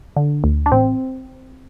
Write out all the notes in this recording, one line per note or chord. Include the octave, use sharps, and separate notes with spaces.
D3
D2
D4
A1 C4